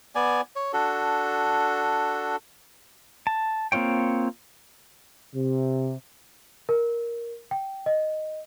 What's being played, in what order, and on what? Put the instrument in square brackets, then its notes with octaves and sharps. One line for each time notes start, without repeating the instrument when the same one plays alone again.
[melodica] B3 D5 G#5
C#5
D4 F#4 A4
[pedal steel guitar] A5
A#3 C4 F4 C#5 G5
[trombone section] C3
[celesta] A#4
G5
D#5